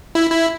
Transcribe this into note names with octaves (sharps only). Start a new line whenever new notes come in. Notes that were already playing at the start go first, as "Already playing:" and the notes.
E4
E4